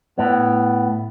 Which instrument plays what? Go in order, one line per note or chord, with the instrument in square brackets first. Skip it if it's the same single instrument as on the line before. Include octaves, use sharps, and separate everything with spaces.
[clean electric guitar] A2 B3